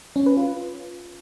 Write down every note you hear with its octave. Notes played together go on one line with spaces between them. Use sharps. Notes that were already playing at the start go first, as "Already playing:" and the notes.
C#4
B4
F4